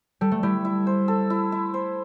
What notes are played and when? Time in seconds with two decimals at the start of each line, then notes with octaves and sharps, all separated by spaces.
0.21 G3 A4
0.31 A3
0.43 G3 E4
0.65 E4
0.87 C5
1.08 A4
1.30 E4
1.52 E4
1.74 C5